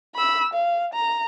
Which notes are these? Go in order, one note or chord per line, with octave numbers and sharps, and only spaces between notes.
B5 E6
F5
A#5